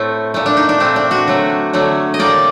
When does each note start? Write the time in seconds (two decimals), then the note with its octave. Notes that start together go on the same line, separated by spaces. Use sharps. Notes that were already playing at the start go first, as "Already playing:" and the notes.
Already playing: A2 A3 C4
0.34 A#2 A3
0.46 D4
0.57 D#4
0.69 D4
0.80 A#2 A3 C4
0.96 D4
1.11 F#4
1.27 D3 F#3 A3
1.73 D3 F#3 A3
2.14 D#5
2.19 A2 G3 A#3 D5